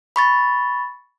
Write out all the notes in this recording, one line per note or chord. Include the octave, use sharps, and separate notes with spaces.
B5 C#6 A6